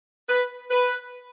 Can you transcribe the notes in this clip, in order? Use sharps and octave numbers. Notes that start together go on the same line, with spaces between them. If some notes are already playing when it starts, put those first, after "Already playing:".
B4
B4